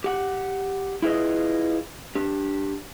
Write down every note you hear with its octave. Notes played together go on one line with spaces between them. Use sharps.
G4 F#5
E4 F4 G#4 B4 D#5
D4 G4